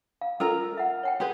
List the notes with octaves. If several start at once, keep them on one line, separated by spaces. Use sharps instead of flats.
F5
C#4 F4 A4 A#4 A#5 E6
E5 F#5
C#5 F#5 G5
G4 G#4 B4